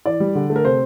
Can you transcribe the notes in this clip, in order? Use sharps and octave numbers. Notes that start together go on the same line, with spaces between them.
E3 D5
G3
D3
A3
A#4
C3 C5